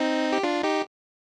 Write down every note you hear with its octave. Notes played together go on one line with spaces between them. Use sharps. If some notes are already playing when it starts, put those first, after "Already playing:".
Already playing: C4 D#4
G4
D4 F4
D#4 G4